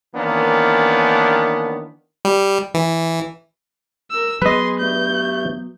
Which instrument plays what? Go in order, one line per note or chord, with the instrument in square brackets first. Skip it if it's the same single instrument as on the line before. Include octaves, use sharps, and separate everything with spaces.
[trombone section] D#3 E3 A#3 B3 C#4 D4
[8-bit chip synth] G3
E3
[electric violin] A#4 E6
[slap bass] F#3 B3 [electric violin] G#4 C6 [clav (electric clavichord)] B4 D#5
[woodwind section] G2 A3 [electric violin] G6